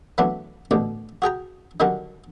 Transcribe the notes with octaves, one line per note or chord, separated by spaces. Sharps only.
E3 F#3 A3 B3 D4
A1 D2 B2 D5
F#4 G#4 G5 A#5
D3 D#3 F#3 G3 C#4 F#4